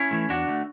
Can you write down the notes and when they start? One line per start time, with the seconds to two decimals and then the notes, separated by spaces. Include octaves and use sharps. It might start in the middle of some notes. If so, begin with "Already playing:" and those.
Already playing: C#4 E4
0.11 E3 A3
0.29 E2 D4 F#4
0.47 D3 A3